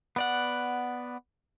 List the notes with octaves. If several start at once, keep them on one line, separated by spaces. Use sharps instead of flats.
B3 D5 F#5